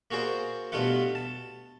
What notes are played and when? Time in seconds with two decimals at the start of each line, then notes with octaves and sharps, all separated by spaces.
0.11 A#3 F#4 G#4 C5 D5
0.72 G2 B2 A3 B3 F4 F#5
1.15 A5